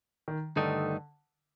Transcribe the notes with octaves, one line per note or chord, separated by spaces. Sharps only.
D#3
G2 D3 D#3 A3 D#4